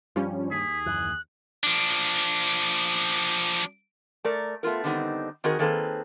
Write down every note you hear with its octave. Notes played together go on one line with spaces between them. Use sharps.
G2 F3 G3 C#4
D#2 G#4 B6
F#1 F#2 E3 F#6
F3 D4
A3 A#4 D5
A3 B3 F4 A#4
D3 D#3 G3 B3 C4 D#4
D#3 C4 F#4 G#4 A#4 D#5
D#3 A#3 C4 G#4 A4 B4